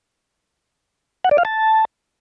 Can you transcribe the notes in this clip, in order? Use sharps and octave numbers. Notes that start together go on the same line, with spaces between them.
F#5
D5
F5
A5